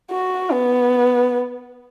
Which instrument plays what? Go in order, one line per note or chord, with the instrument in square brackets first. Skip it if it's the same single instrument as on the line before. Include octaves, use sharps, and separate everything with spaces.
[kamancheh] F#4
B3